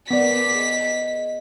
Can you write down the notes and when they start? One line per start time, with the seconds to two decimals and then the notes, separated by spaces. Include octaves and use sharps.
0.11 B3 A#4 D5 D6 B6
0.53 G#4 D#5